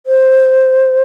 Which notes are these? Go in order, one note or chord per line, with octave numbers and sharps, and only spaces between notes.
C5